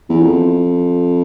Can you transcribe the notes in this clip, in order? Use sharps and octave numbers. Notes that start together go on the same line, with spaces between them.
E2
F2